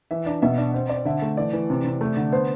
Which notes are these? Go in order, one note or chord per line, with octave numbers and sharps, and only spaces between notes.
E3 E5
D4
B2 E5
D4
C4
C4 D5
D3 E5
A3
E3 D5
E3
C3
C3
A3
D3
B3 C5